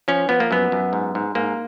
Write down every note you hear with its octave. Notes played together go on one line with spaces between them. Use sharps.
F3 C#4
F3 B3
A#3
F#2 B3
F#2
G#2
G#2
G#2 A#3